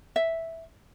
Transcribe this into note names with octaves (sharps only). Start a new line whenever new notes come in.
E5